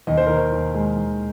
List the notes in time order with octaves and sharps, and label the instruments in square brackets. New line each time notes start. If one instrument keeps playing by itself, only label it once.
[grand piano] D#2 D#5
C5
D#3 A#4
C5
D#2
G#3
D#2